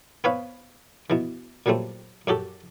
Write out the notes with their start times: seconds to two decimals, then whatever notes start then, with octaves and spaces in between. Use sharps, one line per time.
0.24 B3 C4 B4 C#5 F5
1.10 B2 E3
1.66 A#2 F#3 G3 A3 C4
2.27 F#2 F#4 G4 A4